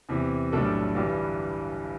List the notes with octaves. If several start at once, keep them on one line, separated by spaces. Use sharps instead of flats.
E2 C3 E3
B1 A2 G3 D4 A4
G1 G2 E3 G3